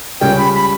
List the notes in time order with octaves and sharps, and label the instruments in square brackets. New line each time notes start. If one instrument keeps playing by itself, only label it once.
[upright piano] C#2 C#3 G3 C#4 [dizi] G5
[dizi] B5
B5